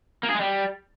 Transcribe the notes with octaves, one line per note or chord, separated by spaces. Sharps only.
A#3
G#4
G#3
G3